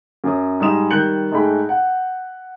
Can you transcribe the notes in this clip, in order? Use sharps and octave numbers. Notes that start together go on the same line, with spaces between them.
F#2 C#5 D#6
G#2 G3 G#3 D#5 D#6 E7
D#3 G3 F#6 G6 C#7 F#7
G#2 A3 D#4 G#4 G5 B5
F#5